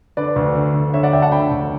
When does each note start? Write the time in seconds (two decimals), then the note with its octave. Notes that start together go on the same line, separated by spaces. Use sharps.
0.17 D3 B4 D5
0.36 D2
0.55 D3
0.74 D2
0.94 D3 C#5 E5
1.03 D5 F#5
1.13 D2 E5 G5
1.22 F#5 A5
1.32 D3 G5 B5
1.51 D2